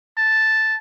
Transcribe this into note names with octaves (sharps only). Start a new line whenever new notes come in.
A5